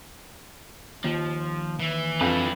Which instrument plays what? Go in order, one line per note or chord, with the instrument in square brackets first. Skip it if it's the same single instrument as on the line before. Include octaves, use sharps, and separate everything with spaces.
[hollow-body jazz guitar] D#2 [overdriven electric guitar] F3
[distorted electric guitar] E3
[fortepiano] F2 [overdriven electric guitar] D4 B4